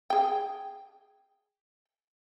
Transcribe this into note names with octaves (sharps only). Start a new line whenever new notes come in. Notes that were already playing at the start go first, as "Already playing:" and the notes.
G#4 G5